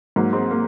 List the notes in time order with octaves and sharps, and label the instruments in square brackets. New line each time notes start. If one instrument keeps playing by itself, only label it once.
[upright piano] G#2 F#3 A#3
G#3 C4
A#3